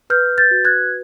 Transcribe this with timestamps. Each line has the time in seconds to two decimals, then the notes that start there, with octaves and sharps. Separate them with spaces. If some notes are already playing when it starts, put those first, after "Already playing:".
0.10 B4 F6 G6
0.38 G6 A6
0.51 F#4
0.65 F#6 G#6